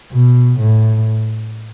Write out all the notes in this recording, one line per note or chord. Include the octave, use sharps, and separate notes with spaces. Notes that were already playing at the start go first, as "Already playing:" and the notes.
B2
A2